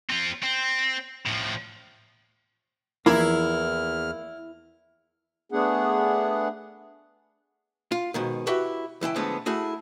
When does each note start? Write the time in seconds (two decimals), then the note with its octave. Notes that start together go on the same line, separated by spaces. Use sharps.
0.10 C4 F4
0.43 C4
1.26 A2 F3
3.06 E2 E3 F3 A#3 E4 F6 G#6
5.52 A3 B3 D4 G#4 F#5
7.92 F4
8.14 G#2 B2 D#3
8.47 E4 F#4 G4 B4 E5
9.01 C#2 E3 E4 G5
9.16 A2 D3 F3 G#3 A3 B3
9.46 A3 E4 F#4 G#4